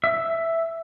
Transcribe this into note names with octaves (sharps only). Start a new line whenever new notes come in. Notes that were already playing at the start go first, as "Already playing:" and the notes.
E5